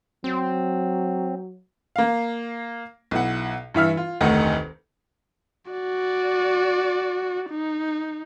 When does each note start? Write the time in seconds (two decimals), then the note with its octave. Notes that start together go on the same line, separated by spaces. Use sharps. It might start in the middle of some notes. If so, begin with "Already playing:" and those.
0.24 F#3 C4
1.96 A#3 F5
3.11 B1 E4 F#5
3.74 G2 E3 E5 F6
3.97 F4
4.21 F1 D2 D#3 A3 D#4 F#5
5.71 F#4 D5
7.50 D#4